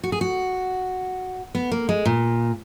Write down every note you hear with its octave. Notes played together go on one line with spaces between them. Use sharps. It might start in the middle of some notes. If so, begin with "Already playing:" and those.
F#4
G#4
F#4
B3
A#3
G#3
A#2